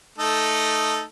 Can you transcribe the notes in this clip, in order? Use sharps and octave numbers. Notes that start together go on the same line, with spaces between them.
A3 D#4 A4